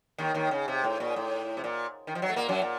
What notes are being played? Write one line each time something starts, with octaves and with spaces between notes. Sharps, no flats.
D#2 D#3
D#2 D#3
C#3
C3
A2
A#2
A2
C3
A#2
D#3
F3
F#3
A3
A#2 A#3
F#2 F#3
A#2